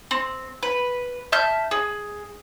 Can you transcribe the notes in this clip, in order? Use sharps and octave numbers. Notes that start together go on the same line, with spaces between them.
C4
B4
E5 A5 F6 G6
G#4